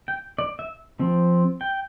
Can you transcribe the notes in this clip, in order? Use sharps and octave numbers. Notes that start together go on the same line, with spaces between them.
G5
D5
E5
F3 C4
G5